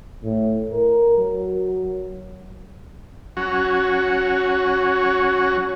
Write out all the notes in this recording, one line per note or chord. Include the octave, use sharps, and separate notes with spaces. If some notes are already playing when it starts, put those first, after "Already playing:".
A2
A#4
F#3
F#3 C#4 F#4